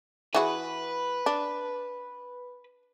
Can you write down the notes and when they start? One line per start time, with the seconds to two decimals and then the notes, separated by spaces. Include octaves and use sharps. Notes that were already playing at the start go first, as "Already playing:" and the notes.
0.34 E3 F#4 G#4 B4 B5
1.26 D4